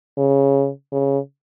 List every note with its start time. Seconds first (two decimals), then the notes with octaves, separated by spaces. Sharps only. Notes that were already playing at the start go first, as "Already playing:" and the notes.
0.17 C#3
0.92 C#3